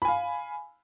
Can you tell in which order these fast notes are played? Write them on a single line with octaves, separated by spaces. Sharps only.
B5 G#5 F5